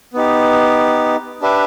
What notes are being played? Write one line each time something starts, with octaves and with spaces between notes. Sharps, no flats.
B3 D#4 G4
D4 G4 B4 E5